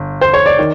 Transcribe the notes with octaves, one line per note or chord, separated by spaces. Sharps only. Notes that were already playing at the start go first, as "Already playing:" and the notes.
Already playing: G1
C5
C#5
D5
D#3